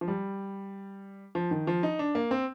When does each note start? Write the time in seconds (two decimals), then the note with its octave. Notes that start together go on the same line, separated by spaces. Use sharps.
0.01 F3
0.08 G3
1.35 F3
1.51 D#3
1.67 F3
1.83 D#4
1.99 D4
2.15 A#3
2.31 C4